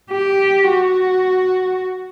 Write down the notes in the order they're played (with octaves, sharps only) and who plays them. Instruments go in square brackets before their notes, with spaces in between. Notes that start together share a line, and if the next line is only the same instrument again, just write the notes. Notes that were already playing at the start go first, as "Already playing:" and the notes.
[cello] G4
F#4